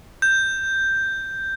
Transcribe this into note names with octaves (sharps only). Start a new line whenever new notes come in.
G6